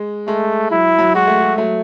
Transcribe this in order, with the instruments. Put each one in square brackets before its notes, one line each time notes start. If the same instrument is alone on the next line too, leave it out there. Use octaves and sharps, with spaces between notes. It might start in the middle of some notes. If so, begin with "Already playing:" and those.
Already playing: [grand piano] G#3
[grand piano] G#3 [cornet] A3
[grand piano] F#3 [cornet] E4
[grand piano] F#3
[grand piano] G#3 [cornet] F#4
[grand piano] A3
G#3
F#3 A3